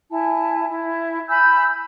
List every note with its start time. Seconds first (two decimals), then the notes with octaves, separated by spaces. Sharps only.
0.11 E4 G#5 A5
0.69 E4
1.28 G#5 B5 E6 G6